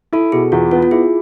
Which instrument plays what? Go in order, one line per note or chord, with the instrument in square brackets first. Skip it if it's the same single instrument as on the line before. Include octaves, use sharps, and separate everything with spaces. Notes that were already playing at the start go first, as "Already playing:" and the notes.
[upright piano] E4 [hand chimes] A4
[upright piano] B2 [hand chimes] G#4
[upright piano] E2 [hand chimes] F4
[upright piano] B3 [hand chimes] F4
[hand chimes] F4
[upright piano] E4 [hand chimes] G#4